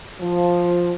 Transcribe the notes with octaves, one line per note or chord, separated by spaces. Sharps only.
F3